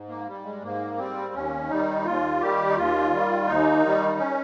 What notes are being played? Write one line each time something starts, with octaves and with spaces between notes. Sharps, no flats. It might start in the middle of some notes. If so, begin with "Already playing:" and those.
Already playing: G#2
A#3
G3
G#3
G#2 A#3
G3 C4
D#2 C#4
D#3 G3 D#4
D#2 F4
D#3 G3 G4
D#4
D#2 F4
D#3 G3
D#2 D#4
D#3 G3
C#4